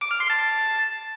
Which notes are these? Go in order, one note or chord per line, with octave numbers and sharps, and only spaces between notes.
D6
F6
C6
A5